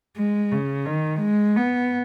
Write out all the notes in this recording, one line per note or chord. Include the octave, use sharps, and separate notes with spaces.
G#3
C#3
D#3
G#3
B3